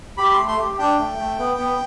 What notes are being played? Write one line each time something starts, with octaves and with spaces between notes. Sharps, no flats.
G4 B5
A3 C6
C6
G4
D4 G5
A3
A3
B3
B3